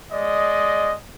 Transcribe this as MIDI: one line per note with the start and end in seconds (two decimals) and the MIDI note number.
0.12 0.94 56
0.12 0.94 74
0.12 0.94 75